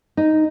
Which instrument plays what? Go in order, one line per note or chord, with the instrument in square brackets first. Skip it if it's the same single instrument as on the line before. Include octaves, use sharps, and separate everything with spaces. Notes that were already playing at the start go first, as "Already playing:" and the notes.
[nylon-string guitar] D#4